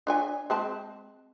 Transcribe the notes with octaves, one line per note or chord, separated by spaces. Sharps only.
D4 C#5 G#5
G#3 C4 A5